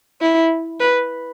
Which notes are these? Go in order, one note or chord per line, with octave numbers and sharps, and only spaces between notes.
E4
B4